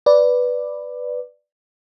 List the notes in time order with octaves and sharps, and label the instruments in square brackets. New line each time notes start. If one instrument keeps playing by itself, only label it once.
[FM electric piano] B4 D5